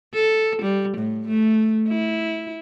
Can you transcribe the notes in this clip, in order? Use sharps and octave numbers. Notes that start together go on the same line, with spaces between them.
A4
G3
A2
A3
E4